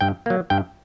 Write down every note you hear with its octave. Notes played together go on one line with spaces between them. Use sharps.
G2 G5
F#3 A#3
G2 G5